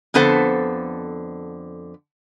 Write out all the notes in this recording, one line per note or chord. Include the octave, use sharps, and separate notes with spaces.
F2 D3 B3 A4 C5 F#5